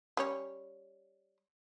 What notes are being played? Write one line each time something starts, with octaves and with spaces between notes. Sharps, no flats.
G3 C#4 C#5